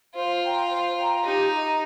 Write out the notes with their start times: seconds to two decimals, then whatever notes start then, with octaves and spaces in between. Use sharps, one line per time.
0.15 F4 C5
0.43 G5 A#5
0.70 C5
0.97 G5 A#5
1.24 D#4 G4
1.52 D#5 A#5